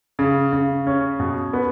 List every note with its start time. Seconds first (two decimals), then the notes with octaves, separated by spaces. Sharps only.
0.19 C#3
0.53 C#3
0.87 C#4
1.20 B2
1.53 B3